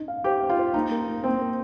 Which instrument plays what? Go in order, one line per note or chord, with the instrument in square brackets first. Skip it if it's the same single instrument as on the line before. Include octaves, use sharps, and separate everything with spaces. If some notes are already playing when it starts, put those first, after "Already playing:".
Already playing: [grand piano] D#4
F5
[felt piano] G4 [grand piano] C5
[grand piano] F5
[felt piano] F4
[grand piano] C5
[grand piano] A#3 [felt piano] D#4
[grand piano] A#4
A#3
[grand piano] A#3 [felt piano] C4
[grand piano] A#4